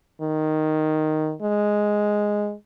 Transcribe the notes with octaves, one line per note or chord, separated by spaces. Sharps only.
D#3
G#3